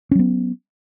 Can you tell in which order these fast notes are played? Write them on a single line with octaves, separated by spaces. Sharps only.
C#4 F#3 B3